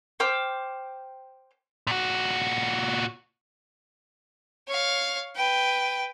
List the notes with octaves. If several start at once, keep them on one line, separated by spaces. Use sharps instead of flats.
C5 G5 D6 F6
A#2 F#4
C#5 F5
B4 G5